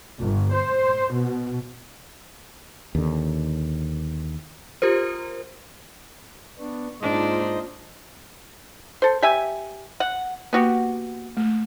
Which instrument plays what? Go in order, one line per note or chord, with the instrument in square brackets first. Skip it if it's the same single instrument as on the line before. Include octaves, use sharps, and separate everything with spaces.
[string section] G1
C5
B2
[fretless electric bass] D#2 D3
[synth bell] F4 G4 A#4 C5
[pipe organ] B3 D4 [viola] C#6
[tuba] G#2 [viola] A#3 F4 [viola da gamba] D4 [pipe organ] D#4 C5 D#5
[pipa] A4 C5
G4 E5 G#5
F#5
[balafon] A#3 [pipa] B3 F#4 G4
[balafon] A3